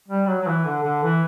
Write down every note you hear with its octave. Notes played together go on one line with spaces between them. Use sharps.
G3
F#3
F#3
E3
D3
D3
E3